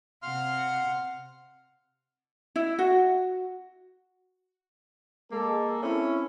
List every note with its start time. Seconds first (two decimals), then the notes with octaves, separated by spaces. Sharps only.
0.23 C3 F5 F#5 C6 F6
2.56 E4
2.79 F#4
5.32 G#3 A#3 A4
5.83 C4 C#4 E4